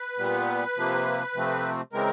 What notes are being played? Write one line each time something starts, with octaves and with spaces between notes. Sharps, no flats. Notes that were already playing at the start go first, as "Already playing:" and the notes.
Already playing: B4
A#2 G3 B3
C3 F3 A#3
C3 F3 A3 C4
C#3 E3 G#3 C4 A#4